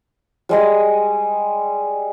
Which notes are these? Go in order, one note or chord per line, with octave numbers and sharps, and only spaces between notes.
G3 G#3 D#6